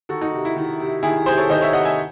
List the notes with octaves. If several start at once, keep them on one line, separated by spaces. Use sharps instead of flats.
D#3 F#4 A4
D#4 F#4
C3
E4
D#3
C3
D#3 E4 G#4
C3 G#4 C5
A4 C#5
D#3 C5 D#5
C#5 E5
C3 D#5 F#5
E5 G#5